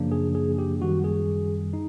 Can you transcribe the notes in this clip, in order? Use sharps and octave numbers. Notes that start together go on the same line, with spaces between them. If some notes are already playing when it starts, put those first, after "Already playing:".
Already playing: F#2 C#3 F3 A#3 D4
G#4
G#4
G4
F#2 D#3 G3 F#4
G#4
D#4